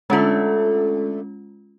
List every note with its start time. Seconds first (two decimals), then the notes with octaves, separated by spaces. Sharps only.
0.10 D3 G#3 A3 C#4 F4